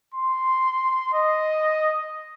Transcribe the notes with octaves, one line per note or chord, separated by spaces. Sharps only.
C6
D#5